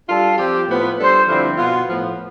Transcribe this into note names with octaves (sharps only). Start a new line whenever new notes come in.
G3 D4 F4 A4
F3 C4 G4
A2 F3 B3
G3 D4 A4 C5
G2 D3 F3 C4 E4
B2 B3 F4
A2 F3 B3